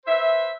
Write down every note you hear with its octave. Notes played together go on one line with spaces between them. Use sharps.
B4 C5 E5